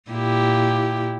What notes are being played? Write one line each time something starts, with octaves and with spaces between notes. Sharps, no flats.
A#2 E4 G4